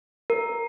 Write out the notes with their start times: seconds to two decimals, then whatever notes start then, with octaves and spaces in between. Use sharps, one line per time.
0.30 A#4